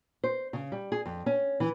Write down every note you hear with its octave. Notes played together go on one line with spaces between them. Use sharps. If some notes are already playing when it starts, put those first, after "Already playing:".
C5
C#3
G3
G#4
F2
C#4
E3